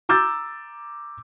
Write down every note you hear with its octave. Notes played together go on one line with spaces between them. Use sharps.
A#5 D6 E6 G6 A6